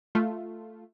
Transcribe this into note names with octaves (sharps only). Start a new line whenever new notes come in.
A3 F4